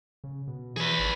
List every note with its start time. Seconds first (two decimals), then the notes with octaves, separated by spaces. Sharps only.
0.24 C#3
0.47 B2
0.77 E3 G#4 B4
0.99 G#1